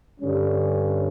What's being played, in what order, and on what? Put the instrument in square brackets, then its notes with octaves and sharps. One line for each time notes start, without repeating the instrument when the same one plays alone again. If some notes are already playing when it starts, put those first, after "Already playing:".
[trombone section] G2 D3 G3 C#4